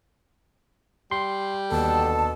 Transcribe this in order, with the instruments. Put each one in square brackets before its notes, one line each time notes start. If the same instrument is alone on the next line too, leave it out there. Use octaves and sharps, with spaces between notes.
[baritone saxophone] G3 [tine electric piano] C6
[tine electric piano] D#2 [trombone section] B2 D3 A4 [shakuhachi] A5